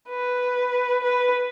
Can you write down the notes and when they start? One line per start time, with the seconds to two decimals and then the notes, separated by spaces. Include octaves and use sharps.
0.09 B4
1.04 B4